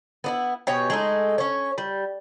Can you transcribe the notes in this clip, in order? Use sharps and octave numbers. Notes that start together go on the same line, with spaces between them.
B3 D4 E4
B2 G4 C#5 G#5
G#3 A3 D#4
C#4 C#5
G3